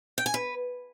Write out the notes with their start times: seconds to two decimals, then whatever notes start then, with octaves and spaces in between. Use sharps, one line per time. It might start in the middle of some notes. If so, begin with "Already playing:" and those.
0.18 G5
0.26 G#5
0.34 B4